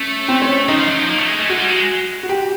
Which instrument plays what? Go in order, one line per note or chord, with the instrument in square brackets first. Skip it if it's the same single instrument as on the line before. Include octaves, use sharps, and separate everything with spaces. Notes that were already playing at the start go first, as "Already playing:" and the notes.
Already playing: [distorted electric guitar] A3 [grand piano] C#4
[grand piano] C4
C#4
[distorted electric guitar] F3 [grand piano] D#4
[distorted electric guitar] F3
F#3
F3
A#3
A3
G#3
A3
[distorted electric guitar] G#3 [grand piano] F#4
[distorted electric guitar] G3
G#3
[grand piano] F#4
G4